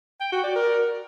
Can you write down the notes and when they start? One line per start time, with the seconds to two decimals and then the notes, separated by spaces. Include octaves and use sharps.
0.20 G5
0.32 F#4
0.44 D5
0.55 A#4